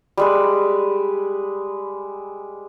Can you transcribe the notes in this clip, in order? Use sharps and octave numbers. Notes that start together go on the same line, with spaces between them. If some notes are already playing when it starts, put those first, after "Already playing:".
G3 G#3 B4